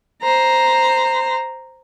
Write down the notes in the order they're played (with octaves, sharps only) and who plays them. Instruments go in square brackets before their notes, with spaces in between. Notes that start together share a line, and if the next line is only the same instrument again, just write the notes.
[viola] C5 A#5